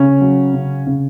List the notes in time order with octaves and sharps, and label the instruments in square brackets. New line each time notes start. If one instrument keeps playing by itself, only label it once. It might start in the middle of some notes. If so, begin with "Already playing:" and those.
Already playing: [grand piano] C#3 C#4
F#3
C#3
C#3